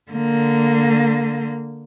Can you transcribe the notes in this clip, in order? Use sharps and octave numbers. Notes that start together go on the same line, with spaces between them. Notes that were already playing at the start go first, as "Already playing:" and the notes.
D3 A#3